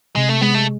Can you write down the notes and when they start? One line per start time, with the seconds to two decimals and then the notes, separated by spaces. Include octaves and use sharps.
0.16 C3 G#3
0.29 A3
0.42 G#3 B3
0.55 A3